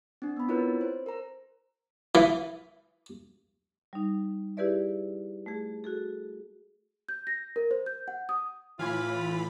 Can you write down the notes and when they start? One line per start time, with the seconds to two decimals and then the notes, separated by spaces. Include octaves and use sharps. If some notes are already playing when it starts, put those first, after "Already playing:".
0.22 C4 D4
0.36 B3 B5
0.48 C4 E4 F4 A#4 B4 C#5
0.81 C5
1.06 A#4 A#5
2.15 E3
3.93 G3 D#4
4.57 E4 G4 G#4 B4 D5 E5
5.46 A3 G#4
5.84 F#4 G#4 A4
7.09 G6
7.27 A#6
7.56 A#4
7.71 C5
7.86 G6
8.08 F#5
8.29 D#6
8.79 A2 E3 F4 F5 G#5 B5 C6